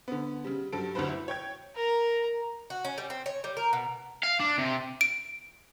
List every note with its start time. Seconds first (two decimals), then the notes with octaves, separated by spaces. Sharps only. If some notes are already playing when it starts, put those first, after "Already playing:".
0.08 D3 B3
0.44 C#3 G3
0.72 G2 F#3 G3 A4 D7
0.95 F#1 D2 G2 F#4 B4 C5
1.09 E4
1.28 C#5 G5 G#6
1.75 A#4 A#5
2.70 F#4
2.85 C#4
2.98 G3
3.10 C4
3.26 C#5
3.44 G3
3.57 A#4
3.73 B2
4.23 F5
4.40 D4
4.58 C3
5.01 D7